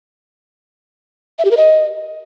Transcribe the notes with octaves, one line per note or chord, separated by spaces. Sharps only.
E5
G4
A#4
D#5